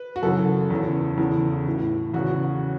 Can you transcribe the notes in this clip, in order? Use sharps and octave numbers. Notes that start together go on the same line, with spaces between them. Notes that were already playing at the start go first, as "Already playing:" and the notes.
Already playing: B4
F#4
F#2 C#3 E3 A4
E2 C#3 E3
E2 C#3 E3
A2 E3
E2 C#3 E3 F#4